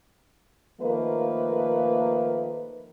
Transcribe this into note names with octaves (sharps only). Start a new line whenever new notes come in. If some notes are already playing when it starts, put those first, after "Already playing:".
D#3 F3 A3 A#3 A#4 B4